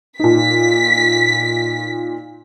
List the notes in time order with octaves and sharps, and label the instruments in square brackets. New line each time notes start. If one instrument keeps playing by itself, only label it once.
[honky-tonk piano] A#2 D#4 [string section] B6